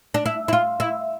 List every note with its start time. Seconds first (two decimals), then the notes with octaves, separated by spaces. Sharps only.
0.14 D4
0.26 E4
0.48 E4
0.53 F4
0.80 E4